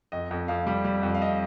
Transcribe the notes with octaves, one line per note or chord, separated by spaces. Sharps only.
F2 D#5
F2
F2 F5
G3
G3
F2
F5
D#5